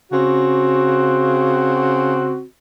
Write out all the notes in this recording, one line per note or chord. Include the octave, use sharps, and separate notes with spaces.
C#3 C4 F#4